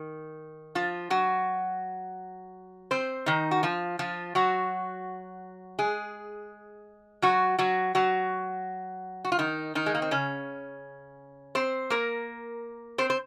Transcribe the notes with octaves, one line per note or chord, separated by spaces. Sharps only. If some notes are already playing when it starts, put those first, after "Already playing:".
Already playing: D#3
F3 F4
F#3 F#4
C4 C5
D#3 D#4
F#4
F3 F4
F3 F4
F#3 F#4
G#3 G#4
F#3 F#4
F#3 F#4
F#3 F#4
F#4
F4
D#3 D#4
D#3 D#4
G#3
A#3
C4
C#3 C#4
C4 C5
A#3 A#4
C4 C5
C5